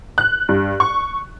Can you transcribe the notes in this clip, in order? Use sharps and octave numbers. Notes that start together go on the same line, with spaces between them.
F#6
G2
C#6